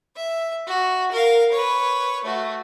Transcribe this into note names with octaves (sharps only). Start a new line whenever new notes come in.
E5
F#4
A#4 F5
B4 C#5
A3 F#4